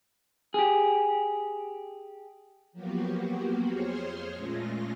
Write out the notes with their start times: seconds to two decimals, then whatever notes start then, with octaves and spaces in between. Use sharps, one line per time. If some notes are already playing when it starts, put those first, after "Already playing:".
0.54 G4 G#4
2.73 F3 F#3 A#3 B3 F#4 G4
3.70 F2 G#4 C5 C#5 C6 F6
4.34 A#2 G#3 A3 C#4 F4 A#6